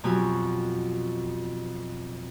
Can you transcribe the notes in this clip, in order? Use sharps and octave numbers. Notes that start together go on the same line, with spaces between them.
F2 B2 F#3 G4 G#5